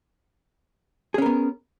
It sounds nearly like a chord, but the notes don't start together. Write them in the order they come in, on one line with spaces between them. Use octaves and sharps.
G#4 C#4 A#4 B3